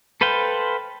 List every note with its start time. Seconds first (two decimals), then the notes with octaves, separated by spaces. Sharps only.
0.21 A4 B4 C5 F5 G5